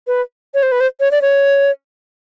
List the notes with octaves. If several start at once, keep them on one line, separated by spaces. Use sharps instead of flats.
B4
C#5
C5
B4
C5
C#5
D5
C#5